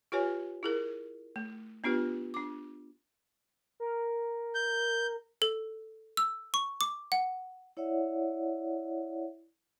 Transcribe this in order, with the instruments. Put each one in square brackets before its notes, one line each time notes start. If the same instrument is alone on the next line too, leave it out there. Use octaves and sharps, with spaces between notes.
[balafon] F4 G4 B4 C#5 G#5
E4 G#4 A#4
A3
B3 D4 F4 G4 B4
D4 D6
[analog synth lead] A#4
[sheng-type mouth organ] G6
[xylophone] A4
E6
C#6
D6
F#5
[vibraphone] E4 C#5 D5 E5 F#5